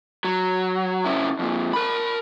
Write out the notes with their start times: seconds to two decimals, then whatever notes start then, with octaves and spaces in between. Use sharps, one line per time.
0.24 F#3
1.06 C#3 E4
1.39 F2 A#2
1.73 A#4 B5